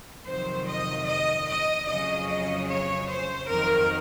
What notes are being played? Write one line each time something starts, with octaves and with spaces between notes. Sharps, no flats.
F2 C3 D#3 F#3 C5
D#5
D#5
D#5
F2 C#3 F#3 D#5
D#5
C#5
C5
F2 D#3 F#3 A#4